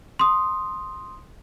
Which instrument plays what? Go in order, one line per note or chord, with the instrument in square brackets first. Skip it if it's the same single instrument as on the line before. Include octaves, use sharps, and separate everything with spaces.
[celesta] C6 D#6